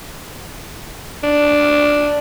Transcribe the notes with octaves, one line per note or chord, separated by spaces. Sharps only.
D4